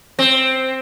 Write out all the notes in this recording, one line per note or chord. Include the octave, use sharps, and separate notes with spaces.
C4